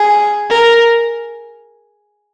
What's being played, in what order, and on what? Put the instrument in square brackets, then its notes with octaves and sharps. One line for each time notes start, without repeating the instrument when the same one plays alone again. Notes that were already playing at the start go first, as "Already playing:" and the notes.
Already playing: [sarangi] G#4
[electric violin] A#4